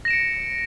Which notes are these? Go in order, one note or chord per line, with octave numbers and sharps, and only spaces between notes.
A#6 C#7 D7 E7